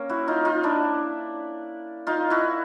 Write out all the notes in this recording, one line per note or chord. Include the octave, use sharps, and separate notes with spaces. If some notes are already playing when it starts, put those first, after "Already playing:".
Already playing: A#3 C#4
E4 F#4
D#4 F4
D#4 F4
D4 E4
D#4 F4
E4 F#4